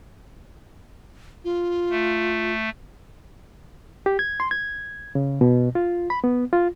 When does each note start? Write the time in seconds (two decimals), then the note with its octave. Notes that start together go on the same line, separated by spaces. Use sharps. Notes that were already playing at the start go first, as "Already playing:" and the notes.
1.44 F4
1.90 A3
4.06 G4
4.19 G#6
4.40 C6
4.51 G#6
5.15 C#3
5.41 B2
5.75 F4
6.10 B5
6.24 B3
6.53 F4